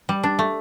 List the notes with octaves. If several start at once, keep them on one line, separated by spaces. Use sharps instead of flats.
G3
D4
A3